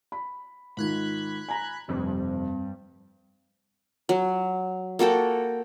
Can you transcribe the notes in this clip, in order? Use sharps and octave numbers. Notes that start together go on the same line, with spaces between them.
B5
G#2 D#3 F4 B5 F#6 G#6
G#5 A#5
F1 G2 C4
F#3
A#3 F#4 A4 G5